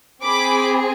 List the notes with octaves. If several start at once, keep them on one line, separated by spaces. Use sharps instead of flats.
C4 G#4 B5 D6